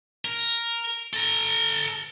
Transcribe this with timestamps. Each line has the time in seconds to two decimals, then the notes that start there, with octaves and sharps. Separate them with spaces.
0.25 A#4
1.13 A4 A#5